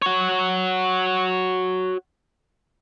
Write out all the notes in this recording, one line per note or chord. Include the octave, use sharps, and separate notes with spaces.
F#4 C#5